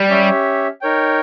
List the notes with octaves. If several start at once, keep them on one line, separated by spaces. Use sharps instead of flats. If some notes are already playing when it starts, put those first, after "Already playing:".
Already playing: G3
C#4 G4 C#5 E5
D#4 A#4 C#5 G5